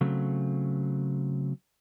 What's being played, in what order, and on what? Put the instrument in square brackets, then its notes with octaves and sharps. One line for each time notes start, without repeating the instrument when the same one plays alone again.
[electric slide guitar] C#3 F#3 A3 C4